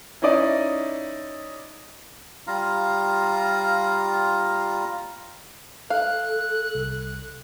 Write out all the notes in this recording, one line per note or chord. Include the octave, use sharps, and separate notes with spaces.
C#4 D#4 E4 D5 D#5
G3 F4 F5 A#5
A4 F5 F#6
C2